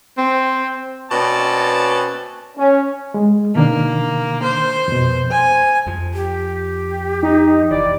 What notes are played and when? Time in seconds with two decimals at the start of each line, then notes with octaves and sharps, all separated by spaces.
0.18 C4
1.10 B2 A#3 C4 C#4 D5 A5
2.57 C#4
3.14 G#3
3.55 B2 D#3 A#3 D4
4.43 C5
4.88 F2 B2
5.31 C5 G#5
5.87 F2 F3
6.14 G4
7.23 D#4
7.71 F1 A#1 E3 D5